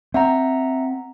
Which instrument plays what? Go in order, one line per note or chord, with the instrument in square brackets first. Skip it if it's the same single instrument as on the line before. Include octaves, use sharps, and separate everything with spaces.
[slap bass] C4 [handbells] E5 F#5 A#5